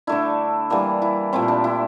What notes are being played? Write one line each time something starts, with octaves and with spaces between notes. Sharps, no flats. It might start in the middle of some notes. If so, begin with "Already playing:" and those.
D3 A3 D4 E4
E3 G3 A#3 D4
E4
A#2 A3 C4 E4
D4
E4